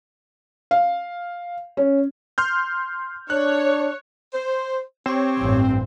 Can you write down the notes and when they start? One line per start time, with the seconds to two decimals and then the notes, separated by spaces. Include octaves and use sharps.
0.71 F5
1.77 C#4
2.38 C6 F6 G6
3.30 D4 C#5 F#6
4.33 C5
5.06 C4 G4 C#5
5.39 A1 G2